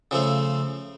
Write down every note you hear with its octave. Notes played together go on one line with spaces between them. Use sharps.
C#3 F3 A3